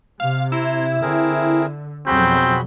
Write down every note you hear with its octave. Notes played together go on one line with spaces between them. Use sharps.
C3 F5
E4 A#5 C6
D3 C4 G#4 A#4
F2 B2 F#3 C4 F#4 G#4 B5 G6